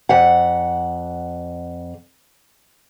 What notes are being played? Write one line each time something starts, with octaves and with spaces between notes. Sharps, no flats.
F2 F#5